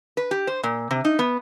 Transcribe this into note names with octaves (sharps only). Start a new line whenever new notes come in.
B4
G4
C5
A#2
C3
D#4
B3